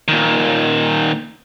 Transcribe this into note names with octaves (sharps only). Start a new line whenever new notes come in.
A#2 D#3